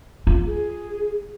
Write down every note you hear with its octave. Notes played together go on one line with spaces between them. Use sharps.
F4
G#4